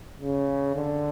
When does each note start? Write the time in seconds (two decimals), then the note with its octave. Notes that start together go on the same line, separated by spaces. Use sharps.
0.21 C#3
0.75 D3